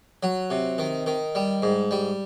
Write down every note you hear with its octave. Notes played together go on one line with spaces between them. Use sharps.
F#3
C3
D#3
D#3
G3
G#2
G3